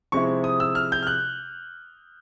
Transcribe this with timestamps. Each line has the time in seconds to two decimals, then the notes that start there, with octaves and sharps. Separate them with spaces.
0.12 C3 F3 G#3 C4 E4 C#6
0.44 D#6
0.60 E6
0.75 F6
0.92 G6
1.02 F6
1.07 F#6